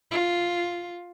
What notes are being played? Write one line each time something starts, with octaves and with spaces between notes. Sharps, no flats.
F4